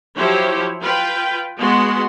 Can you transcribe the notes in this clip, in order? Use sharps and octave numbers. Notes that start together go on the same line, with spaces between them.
F3 F#3 E4 G4 C5 C#5
F4 B4 G5
G#3 B3 F#4 F#5 C6